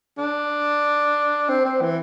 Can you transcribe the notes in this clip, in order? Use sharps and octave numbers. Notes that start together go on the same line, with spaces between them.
D4
C4
C4
E3